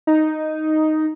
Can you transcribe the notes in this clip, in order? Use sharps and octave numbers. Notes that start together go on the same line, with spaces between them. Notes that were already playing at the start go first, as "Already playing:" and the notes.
D#4